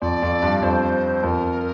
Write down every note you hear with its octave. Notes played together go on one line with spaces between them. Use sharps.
F2 D5
F2
G2
F2 C5
F2 A#4